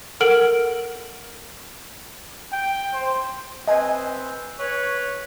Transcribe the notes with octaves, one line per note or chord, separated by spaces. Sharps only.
A4 A#4 F#5 F6 D7 F#7
G5
C5
C4 B4 C5 D#5 G#5
B4 C#5